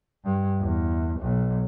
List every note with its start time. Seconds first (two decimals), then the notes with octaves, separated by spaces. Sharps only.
0.24 G2
0.60 E2
1.20 B1